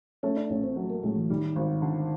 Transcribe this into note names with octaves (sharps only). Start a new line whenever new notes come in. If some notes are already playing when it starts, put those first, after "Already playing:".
A3 C#4
D4
A1 C#4
C4
F#3
A#3
A2 G#3
E3
D#3 G3
G#1
D3